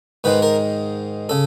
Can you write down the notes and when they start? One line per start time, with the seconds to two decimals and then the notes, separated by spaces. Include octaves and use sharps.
0.24 G#2 D#3 G#3 B4
0.42 A#4
1.29 C#3 A4